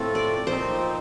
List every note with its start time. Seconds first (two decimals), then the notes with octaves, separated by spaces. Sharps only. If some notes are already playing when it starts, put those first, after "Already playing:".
Already playing: A2 A3 C4 F4 A4
0.15 D5
0.47 A#2 F3 C4 D#4 C5